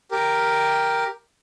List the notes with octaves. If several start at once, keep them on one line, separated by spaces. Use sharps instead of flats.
G4 A#4